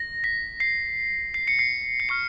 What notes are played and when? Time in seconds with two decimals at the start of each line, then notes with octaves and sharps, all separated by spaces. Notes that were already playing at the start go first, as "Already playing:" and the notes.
Already playing: A#6
0.24 B6
0.60 C7
1.34 C7
1.48 C#7
1.59 C7
2.00 C7
2.09 C#6 F6 C#7